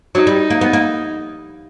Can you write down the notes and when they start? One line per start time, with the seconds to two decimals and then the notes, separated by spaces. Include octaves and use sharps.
0.15 F#3 D#4
0.27 G3
0.50 A#3
0.61 B3
0.73 A#3